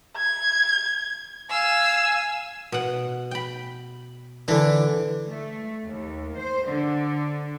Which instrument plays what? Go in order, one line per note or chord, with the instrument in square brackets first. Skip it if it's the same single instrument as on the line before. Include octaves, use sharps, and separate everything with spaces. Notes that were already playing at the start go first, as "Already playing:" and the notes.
[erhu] G#6
[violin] F5 E6 [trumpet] G#5
[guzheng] B2 F#5
G5 B5
[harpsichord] D3 D4 [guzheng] E3
[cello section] A3
D#2
C5
D3